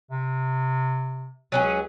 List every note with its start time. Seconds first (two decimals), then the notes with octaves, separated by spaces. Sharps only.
0.11 C3
1.52 C#2 F#3 C#4 G#4